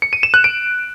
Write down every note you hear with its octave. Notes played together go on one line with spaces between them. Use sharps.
C#7
D#7
E7
F#6
D7